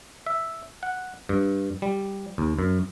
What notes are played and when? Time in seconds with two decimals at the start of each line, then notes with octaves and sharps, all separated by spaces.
0.26 E5
0.83 F#5
1.29 G2
1.82 G3
2.38 D#2
2.59 F#2